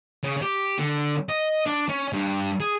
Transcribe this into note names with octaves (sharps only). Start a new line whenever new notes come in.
C#3
G4
D3
D#5
D4
C#4
G2
G#4